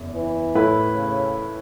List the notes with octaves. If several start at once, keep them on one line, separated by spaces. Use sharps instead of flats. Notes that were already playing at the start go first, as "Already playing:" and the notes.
Already playing: F#1 E2
E3
A2 A3 E4 B4
C#3